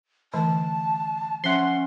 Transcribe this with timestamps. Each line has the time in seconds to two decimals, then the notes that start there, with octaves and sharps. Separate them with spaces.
0.34 D3 E3 A3 A5
1.44 F3 C#4 E5 F#5 C6